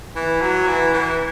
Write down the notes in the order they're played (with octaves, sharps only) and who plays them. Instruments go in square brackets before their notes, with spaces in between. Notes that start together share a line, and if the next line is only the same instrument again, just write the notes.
[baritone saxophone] E3
F#3
E3
E3